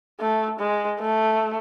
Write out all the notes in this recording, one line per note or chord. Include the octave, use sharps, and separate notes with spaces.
A3
G#3
A3